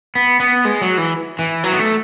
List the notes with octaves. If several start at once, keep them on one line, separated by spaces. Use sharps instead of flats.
B3
B3
G#3
F#3
E3
E3
F#3
B3
A3